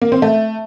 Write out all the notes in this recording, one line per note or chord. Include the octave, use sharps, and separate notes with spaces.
A#3
C4
A3